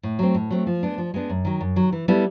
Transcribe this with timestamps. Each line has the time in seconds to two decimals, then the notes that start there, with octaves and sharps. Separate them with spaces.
0.03 A2
0.19 F#3 A3 C4
0.35 A2
0.50 F#3 A3 C4
0.67 F3
0.83 G#3 B3 D4
0.98 F3
1.14 G#3 B3 D4
1.30 F#2
1.45 D#3 F#3
1.61 F#2
1.76 D#3 F#3
1.93 E3
2.08 G3 B3 E4 A4